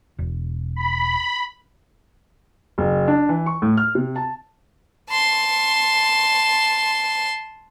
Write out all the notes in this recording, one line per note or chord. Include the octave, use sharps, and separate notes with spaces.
E1
B5
F#1
D4
E3
C#6
A2
F6
C3
A5
A5 C6